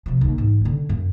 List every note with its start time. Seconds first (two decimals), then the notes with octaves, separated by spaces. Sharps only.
0.06 C3 F3
0.21 A#1 D#2
0.38 G#2 E3
0.61 D3 C#4
0.89 F#2